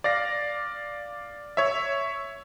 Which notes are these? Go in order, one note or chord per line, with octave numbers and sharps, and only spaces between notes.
D5 F5 A#6
C#5 E5